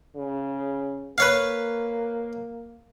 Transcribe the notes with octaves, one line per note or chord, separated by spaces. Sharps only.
C#3
A#3 B4 C#5 F5